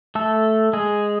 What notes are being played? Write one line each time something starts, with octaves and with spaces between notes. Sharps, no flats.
A3 A4
G#3 G#4